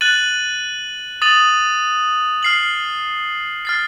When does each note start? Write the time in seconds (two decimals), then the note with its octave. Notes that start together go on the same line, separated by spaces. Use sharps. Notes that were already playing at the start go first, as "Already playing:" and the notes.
0.01 F#6 A6 D#7 F#7
1.22 D#6 A6 D#7 F#7
2.43 F6 C7 F#7
3.65 F6 A6 C7